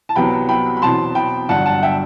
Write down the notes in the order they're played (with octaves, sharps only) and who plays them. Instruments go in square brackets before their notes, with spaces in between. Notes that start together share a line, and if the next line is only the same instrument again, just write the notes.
[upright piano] A5
C2 C3 F#3 B3 G5 B5
G5 B5
B5
E2 B2 F#3 C4 A5 C6
G5 B5
G1 G2 F#3 F#5 A5
F#5 A5
E5 G5